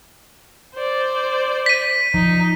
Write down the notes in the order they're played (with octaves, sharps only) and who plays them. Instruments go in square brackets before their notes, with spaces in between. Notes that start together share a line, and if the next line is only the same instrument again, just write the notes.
[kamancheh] C5 D5
[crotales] B6 D#7
[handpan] F3 [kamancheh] D#4